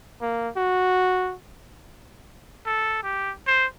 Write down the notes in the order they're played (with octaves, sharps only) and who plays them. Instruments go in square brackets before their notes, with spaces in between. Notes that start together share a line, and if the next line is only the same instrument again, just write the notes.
[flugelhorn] A#3
F#4
[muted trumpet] A4
G4
C5